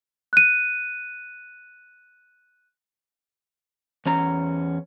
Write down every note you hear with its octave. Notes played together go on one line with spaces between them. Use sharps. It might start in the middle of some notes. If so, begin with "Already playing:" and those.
F#6 D#7
E2 C#4 A#5